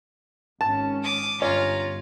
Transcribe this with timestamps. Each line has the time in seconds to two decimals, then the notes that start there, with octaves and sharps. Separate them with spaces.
0.61 G#1 C#4 A5
1.03 D6 D#6
1.42 G1 C#4 F4 A#5